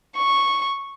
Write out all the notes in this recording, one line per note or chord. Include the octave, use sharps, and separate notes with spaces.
C#6